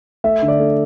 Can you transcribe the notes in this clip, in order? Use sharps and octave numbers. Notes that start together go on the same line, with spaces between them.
A3 E5
D3
D5
A3